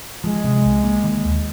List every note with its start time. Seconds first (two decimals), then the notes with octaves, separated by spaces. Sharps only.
0.24 F3 G#3
0.44 C3
0.65 C2
0.84 A#3
1.04 D#3
1.25 D#2